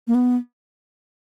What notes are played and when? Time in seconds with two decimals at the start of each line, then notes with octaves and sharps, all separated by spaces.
0.08 A#3
0.15 B3